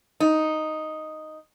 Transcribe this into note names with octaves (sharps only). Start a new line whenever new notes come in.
D#4